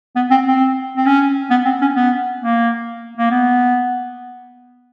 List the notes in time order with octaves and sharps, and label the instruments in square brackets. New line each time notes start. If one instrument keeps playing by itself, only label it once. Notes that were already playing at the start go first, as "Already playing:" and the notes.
[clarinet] B3
C4
C4
C4
C#4
B3
C4
C#4
B3
A#3
A#3
B3